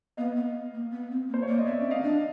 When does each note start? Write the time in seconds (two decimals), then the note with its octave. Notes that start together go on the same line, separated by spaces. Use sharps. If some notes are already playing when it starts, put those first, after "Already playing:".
0.17 B3 D#5 F5
0.36 B3
0.73 A#3
0.92 B3
1.11 C4
1.29 A#3
1.34 C5
1.42 C#5
1.48 A#3 D5
1.59 D#5
1.66 B3 D5 E5
1.80 C#4
1.85 C4
1.91 D#5 F5
2.04 D4